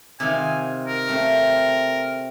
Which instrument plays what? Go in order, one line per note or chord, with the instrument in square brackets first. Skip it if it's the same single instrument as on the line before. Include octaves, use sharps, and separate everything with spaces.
[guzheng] C3 D#3 F4 [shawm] G#5
[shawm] A#4
[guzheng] A3 C4 F4